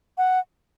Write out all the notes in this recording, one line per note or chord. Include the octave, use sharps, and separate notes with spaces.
F#5